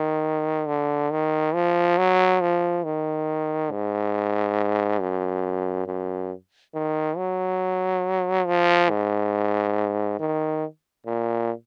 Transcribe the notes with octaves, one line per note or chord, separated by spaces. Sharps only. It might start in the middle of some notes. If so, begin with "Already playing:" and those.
Already playing: D#3
D3
D#3
F3
F#3
F3
D#3
G#2
F#2
F#2
D#3
F#3
F3
G#2
D#3
A#2